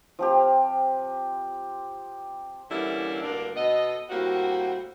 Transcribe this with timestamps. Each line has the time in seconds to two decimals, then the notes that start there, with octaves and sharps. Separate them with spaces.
0.19 F3 C4 G4
2.70 D3 E3 G3 A#3 C#4 E4
3.22 D2 G2 D3 A#3 D4
3.55 B2 B3 A4 D#5
4.09 A2 G3 A#3 C4 F#4